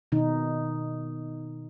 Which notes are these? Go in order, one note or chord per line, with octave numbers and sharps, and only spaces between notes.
B2 D#3 D#4